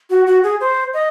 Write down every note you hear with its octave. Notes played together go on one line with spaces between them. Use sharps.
F#4
F#4
G#4
C5
D#5